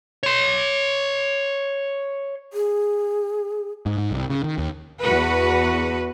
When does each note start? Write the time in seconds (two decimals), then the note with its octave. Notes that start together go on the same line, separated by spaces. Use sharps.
0.23 C#5 C6
2.53 G#4
3.86 G#2
3.98 G#2
4.11 C2
4.30 C#3
4.44 D#3
4.58 D#2
5.01 E2 F#4 B4